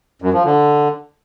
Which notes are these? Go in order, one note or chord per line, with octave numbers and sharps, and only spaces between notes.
F#2
F3
D3